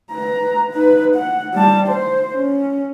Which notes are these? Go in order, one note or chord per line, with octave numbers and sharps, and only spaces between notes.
B4 A#5
D#4 B4
F#5
G3 A5
C5
C#4